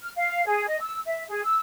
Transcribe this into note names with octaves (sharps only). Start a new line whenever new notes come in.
F6
F5
G#4
D#5
E6
E5
G#4
E6